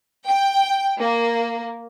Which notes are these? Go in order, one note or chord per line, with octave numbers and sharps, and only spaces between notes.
G5
A#3